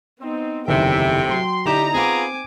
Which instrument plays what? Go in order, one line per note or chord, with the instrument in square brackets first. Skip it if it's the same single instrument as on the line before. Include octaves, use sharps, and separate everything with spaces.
[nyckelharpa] B3 D#4 [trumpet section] C4
[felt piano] F#1 E2 D#3 [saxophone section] A2 C3 [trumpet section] E5 [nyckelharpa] G5
[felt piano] F#3 [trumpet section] C6
[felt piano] D3 E4 E7 [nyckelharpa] D#4 [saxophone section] G4 [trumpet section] A#5
[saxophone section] B3 F4 G#4 [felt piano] C4 [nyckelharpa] G#5 D6